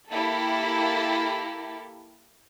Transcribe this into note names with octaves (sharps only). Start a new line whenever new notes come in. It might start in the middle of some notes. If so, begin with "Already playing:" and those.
A#3 E4 G4 A4